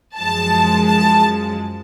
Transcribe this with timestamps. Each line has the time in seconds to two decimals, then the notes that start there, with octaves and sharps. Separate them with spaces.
0.17 F#2 F3 G#3 A5
0.86 A5